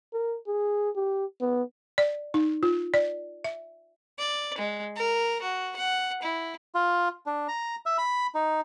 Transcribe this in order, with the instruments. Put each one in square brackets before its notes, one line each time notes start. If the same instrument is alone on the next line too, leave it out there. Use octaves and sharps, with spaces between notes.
[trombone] A#4
G#4
G4
B3
[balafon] D5
D#4
F4
D5
E5
[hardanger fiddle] D5
G#3
A#4
F#4
F#5
E4
[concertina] F4
D4
A#5
E5
B5
D#4